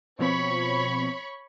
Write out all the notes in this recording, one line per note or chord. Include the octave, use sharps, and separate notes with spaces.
B2 F3 C4 C#5 B5 C#6